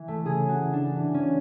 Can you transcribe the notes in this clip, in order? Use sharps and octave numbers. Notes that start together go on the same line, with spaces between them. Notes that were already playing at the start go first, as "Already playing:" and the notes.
Already playing: E3
A3
C#3 G#4
F#4
E3
D4
E3
C#4